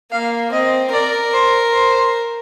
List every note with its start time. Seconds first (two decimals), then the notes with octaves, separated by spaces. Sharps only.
0.12 A#3 F5
0.53 C4 D#5
0.93 A#4 D5
1.33 C5
1.73 C5